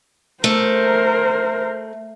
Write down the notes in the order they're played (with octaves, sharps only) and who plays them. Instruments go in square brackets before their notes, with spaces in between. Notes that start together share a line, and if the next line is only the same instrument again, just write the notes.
[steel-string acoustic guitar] A3 [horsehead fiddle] A#4 C5